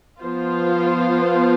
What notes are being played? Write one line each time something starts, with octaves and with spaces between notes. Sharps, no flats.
F3 B3 F4 C5